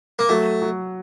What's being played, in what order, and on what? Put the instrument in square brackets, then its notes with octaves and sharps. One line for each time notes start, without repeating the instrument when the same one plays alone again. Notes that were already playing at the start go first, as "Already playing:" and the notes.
[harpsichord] A#3
[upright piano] F#3 [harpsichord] A3
[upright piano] F#3